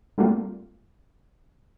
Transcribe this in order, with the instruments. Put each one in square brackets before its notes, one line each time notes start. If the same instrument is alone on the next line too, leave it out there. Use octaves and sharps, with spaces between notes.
[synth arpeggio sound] G3 A3 A#3 C4 F4